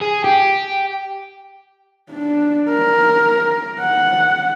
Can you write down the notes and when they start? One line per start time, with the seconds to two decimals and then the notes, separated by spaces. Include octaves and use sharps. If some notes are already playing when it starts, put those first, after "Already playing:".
0.01 G#4
0.24 G4
2.11 D4
2.69 A#4
3.80 F#5